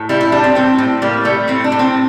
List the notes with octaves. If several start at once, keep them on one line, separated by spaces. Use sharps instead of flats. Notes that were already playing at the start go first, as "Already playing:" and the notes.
Already playing: A2
G3 E4
E4
G3 D4
C4
A2 C4
A2
G3 A#3
G3 A3
A2 C4
D4
A2
C4